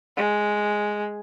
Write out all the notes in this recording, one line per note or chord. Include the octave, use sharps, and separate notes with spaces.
G#3